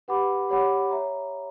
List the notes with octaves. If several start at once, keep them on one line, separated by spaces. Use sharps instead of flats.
G4 B4 F#5 B5 D6
G4 C#5 F#5 B5 D6
C#5 E5 A#5